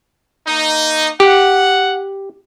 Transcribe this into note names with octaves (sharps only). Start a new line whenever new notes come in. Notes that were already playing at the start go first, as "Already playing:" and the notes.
A#3 D#4
G4 F#5